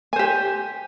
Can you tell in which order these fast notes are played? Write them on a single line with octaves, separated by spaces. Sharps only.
G#5 C5 G4